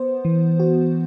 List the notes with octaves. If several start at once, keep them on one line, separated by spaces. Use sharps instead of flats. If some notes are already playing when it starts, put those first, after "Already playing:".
Already playing: B3 C5
E3
F#4